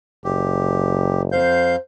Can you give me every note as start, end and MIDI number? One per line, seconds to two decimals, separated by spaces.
0.25 1.37 30
0.25 1.22 67
1.32 1.76 41
1.32 1.78 72
1.32 1.76 77
1.32 1.76 91